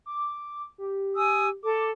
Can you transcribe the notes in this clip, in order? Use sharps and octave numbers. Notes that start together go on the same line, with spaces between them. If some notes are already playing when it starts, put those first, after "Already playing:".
D6
G4
G#5 D#6 E6
A4 D6